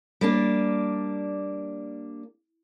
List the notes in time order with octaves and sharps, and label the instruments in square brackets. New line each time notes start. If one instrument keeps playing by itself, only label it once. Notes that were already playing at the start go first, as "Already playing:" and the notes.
[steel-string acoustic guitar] G3 A#3 D4